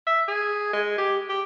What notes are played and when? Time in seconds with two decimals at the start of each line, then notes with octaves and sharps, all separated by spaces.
0.07 E5
0.28 G#4
0.73 G#3
0.98 G4
1.29 G4